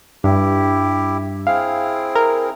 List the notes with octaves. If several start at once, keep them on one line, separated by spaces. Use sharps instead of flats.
G2 E4 G4
C4 E4 G#4 F5
A#4